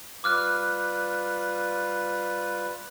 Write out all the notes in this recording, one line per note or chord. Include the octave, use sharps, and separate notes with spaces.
G3 F4 B4 D6 F6 F#6